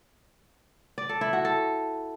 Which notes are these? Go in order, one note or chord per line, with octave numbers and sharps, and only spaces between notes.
D5
A4
E4
F#4
A4